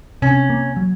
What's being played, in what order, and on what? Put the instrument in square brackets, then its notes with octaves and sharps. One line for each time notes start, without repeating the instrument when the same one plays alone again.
[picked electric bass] C3 [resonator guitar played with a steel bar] C#4
[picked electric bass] A#3
F#3